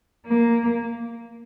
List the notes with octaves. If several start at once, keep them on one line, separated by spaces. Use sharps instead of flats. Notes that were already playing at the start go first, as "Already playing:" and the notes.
A#3